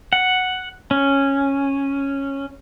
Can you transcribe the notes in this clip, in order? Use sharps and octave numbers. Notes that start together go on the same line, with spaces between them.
F#5
C#4